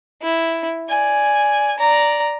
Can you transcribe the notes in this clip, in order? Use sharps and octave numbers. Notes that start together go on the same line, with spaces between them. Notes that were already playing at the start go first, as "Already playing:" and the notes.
E4
D5 G#5
D5 A#5